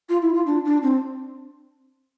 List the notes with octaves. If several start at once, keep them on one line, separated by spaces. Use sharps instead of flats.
F4
E4
F4
D4
D4
C4